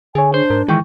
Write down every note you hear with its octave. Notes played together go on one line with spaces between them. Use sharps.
D3 G#4 C#5 G#5
D4 C5
G#2 A#4
D#3 E3 G#3 G5 C#6